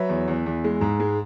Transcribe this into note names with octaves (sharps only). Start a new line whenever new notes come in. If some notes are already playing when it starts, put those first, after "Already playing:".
Already playing: F#3 B4 E5
E2
E2
E2
G#3
G#2
G#3